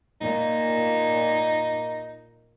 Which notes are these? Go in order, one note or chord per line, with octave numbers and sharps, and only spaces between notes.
A#2 D#4